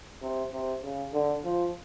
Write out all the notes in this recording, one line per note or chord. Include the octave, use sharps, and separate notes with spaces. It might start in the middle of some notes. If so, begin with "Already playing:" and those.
C3
C3
C#3
D3
F3